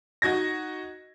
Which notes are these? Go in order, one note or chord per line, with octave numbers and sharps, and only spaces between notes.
D#4 F#4 G#6 A#6